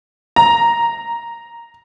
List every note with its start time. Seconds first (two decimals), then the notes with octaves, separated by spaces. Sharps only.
0.36 A#5